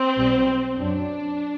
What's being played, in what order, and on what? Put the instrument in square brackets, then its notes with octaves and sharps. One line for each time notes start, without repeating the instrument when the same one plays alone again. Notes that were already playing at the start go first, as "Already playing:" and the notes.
Already playing: [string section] C4
B1 B2 G3
F#2 F#3 D4